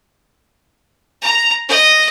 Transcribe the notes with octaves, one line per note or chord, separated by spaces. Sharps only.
A#5
D#5